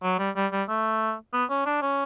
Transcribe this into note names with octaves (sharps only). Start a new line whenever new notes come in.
F#3
G3
G3
G3
A3
B3
C#4
D4
C#4